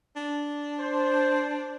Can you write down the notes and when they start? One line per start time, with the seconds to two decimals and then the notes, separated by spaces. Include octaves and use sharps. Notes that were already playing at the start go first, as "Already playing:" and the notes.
0.16 D4
0.79 C5